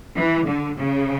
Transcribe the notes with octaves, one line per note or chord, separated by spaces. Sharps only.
E3
D3
C#3